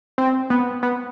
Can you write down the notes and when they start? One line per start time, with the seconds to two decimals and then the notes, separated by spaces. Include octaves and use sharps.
0.18 C4
0.50 B3
0.83 B3